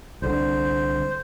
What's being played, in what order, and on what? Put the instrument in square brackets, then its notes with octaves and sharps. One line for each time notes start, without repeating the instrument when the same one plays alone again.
[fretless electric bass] C2 D3 [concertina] C5